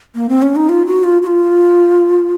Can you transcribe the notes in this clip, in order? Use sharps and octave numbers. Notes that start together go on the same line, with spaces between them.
A#3
C4
C#4
D#4
F4
F#4
F4
F#4
F4